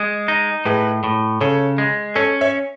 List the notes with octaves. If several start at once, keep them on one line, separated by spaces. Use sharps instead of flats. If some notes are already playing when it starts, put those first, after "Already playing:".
Already playing: G#3
D#4
A2 G#4 B4
A2
C#3 A4 C#5
G#3
C#4 A4 C#5
C#5 E5